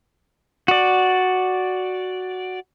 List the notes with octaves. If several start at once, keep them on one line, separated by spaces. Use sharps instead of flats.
F#4 D5